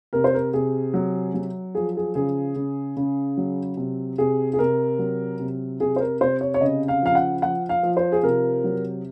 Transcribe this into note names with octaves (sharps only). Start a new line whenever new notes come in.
C3 A#4
C5
A#4
C3 G#4
F#3
F#3
F3 G#4
G#4
C#3 G#4
C#3
C#3
F#3
C3
C3 G#4
G#4
C3 A#4
F#3
C3
C3 G#4
C5
A#4
C3 C5
C#5
C#5
C#3 D#5
F5
F3 F5
F#5
F3 F#5
F5
F3
C5
G#4
C3 A#4
F#3